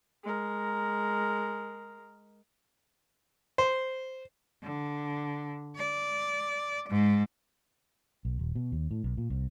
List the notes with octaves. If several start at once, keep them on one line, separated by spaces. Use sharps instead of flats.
G#3 A#4
C5
D3
D5
G#2
B1
D#1
B2
D#2
A2
B1
A#2
C2